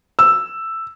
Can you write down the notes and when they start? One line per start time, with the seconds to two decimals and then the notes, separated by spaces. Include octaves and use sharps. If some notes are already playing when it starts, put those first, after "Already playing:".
0.19 E6